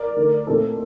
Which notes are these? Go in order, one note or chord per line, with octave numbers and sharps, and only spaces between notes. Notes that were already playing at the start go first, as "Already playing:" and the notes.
Already playing: A#4 D5
D3 A3 D#4
A#2 A3 C4 D#4 A4 C5